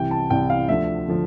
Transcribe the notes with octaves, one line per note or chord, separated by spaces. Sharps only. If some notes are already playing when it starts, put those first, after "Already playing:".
Already playing: C2 C3 E3 G5
A5
C2 C3 E3 G5
F5
D2 D3 F3 E5
D3 F3